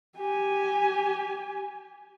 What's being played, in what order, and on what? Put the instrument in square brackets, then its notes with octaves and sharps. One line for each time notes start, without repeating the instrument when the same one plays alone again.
[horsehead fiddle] G4 G#5